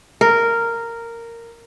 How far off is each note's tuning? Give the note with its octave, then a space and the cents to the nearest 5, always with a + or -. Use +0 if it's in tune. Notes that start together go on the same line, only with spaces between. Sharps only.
A#4 -10